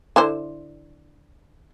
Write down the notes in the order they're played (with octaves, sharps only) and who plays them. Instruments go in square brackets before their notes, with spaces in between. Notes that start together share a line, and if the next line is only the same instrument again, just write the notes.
[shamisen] D3 E4 C5